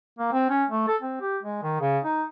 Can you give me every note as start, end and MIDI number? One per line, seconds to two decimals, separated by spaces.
0.19 0.30 58
0.32 0.49 60
0.49 0.65 61
0.70 0.86 57
0.88 0.96 69
1.02 1.16 60
1.21 1.38 67
1.43 1.60 56
1.63 1.78 51
1.81 1.99 49
2.04 2.23 63